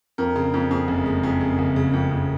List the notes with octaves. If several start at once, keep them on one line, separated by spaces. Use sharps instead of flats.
F2 A#4
C#3
F2
F2 G#4
F#1
G#3
F2 G#4
C#3
F#1
C#3
F2
F2